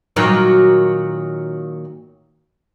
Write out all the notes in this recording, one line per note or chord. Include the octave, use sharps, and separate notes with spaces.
A#2 D#3 F#3